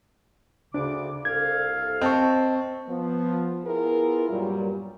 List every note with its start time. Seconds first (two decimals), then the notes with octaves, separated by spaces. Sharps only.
0.74 D2 C#3 D4 D6
1.25 C2 A4 F5 G#6
2.01 C4 D#5 A5 C#6
2.88 F3 B3
3.65 B3 E4 F4 G#4 A#4
4.29 G2 A#2 F#3 G3 A#4